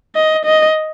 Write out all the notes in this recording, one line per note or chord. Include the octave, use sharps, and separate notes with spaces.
D#5
D#5